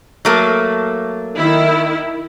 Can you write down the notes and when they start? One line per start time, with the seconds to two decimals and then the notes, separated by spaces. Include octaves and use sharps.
0.25 F#3 A3 A#3
1.38 D#3 E4